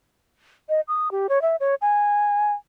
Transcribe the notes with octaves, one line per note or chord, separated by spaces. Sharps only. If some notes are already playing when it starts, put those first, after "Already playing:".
D#5
D#6
G4
C#5
E5
C#5
G#5